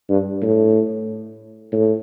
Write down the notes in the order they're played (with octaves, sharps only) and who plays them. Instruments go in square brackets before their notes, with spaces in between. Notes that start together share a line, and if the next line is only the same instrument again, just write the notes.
[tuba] G2
A2
A2